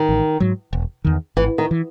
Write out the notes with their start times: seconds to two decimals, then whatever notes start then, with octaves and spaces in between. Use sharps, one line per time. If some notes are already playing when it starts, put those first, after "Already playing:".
Already playing: D#3
0.09 A1
0.40 G#2 F#3
0.73 E1
1.05 E2 D#3
1.36 G#1 E3
1.58 D#3
1.71 E3